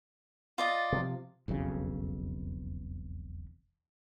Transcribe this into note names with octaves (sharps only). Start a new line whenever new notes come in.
F4 D5 D#5
C3 D#3 F3
E1 B1 F2 C#3